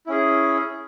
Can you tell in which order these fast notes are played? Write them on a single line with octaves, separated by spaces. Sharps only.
E4 C#4 G#4